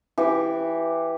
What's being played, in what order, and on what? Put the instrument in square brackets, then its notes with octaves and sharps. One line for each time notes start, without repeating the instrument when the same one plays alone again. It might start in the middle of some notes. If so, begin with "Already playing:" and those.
[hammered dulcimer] E3 G4